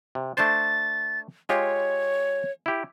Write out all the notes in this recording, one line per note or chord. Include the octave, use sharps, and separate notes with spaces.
C3
A3 D4 C5 A6
G#3 F4 G4 C#5
E4 G4